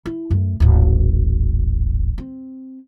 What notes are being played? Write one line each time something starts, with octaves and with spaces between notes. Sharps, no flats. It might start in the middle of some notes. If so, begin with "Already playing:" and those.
E4
F#2 A3
D1 G#1
C4